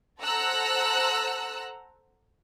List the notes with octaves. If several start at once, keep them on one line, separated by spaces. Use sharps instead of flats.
A4 C5 F#5 A#5 E6 F#6